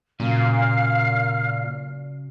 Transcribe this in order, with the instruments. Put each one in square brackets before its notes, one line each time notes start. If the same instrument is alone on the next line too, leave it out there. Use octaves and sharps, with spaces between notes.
[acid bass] A#2 [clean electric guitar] C#3 F#3 [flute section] F5 F6